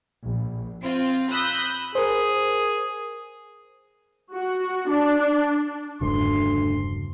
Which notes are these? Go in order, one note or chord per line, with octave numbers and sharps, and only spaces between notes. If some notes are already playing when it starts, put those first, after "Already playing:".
A#1
C4 F4
B5 D#6 E6 F#6 G6 A#6
G#4 A#4 C5
F#4
D4
E1 D2 G2 C#3 C6